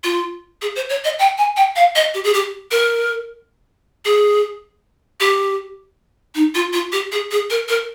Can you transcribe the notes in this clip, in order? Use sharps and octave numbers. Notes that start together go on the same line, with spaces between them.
F4
G#4
C5
C#5
D#5
G5
G#5
G5
F5
D#5
G4
G#4
G4
A#4
G#4
G4
D#4
F4
F4
G4
G#4
G#4
A#4
A#4